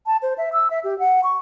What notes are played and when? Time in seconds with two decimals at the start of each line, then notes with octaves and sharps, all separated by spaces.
0.06 A5
0.22 C5
0.38 E5
0.53 E6
0.70 E5
0.84 G4
0.99 F#5
1.23 C#6